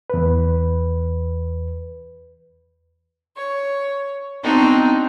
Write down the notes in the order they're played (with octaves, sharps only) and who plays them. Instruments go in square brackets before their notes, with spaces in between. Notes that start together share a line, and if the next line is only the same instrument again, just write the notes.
[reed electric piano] E2 B4
[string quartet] C#5
B3 C4 D4 D#4 F#4